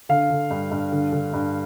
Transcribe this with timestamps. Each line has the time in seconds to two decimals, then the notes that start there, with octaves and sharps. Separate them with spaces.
0.09 D3 F5
0.30 D3
0.51 G2
0.71 G2
0.92 D3
1.13 D3
1.33 G2